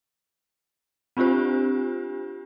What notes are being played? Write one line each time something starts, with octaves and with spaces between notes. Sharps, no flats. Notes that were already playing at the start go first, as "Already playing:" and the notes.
C4 D4 F4 G4 C5